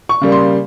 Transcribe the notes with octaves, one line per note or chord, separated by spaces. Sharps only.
C#6
C#3 G3 A#3
C6